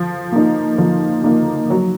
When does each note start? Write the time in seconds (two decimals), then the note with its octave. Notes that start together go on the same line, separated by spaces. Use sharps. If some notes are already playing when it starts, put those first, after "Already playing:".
Already playing: F3
0.32 A#3 D#4
0.78 F3
1.24 A#3 D#4
1.70 F#3